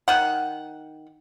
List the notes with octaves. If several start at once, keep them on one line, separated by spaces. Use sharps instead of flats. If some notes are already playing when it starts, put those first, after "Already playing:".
D#3 F#5